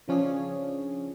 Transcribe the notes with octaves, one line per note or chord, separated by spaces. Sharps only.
C#3 F3 C#4 D4 G#4